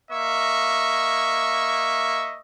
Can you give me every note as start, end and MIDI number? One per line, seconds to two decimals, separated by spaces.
0.11 2.41 58
0.11 2.41 75
0.11 2.41 76
0.11 2.41 85